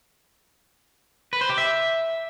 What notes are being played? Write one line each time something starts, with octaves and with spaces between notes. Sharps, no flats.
B4
C5
G4
E5